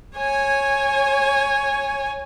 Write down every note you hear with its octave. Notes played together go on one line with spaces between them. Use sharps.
C#5 G#5